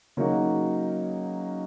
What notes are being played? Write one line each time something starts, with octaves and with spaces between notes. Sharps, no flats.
C#3 F#3 A#3 D#4 F#4